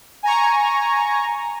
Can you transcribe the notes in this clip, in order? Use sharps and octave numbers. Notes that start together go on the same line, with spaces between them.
G#5 A#5 C#6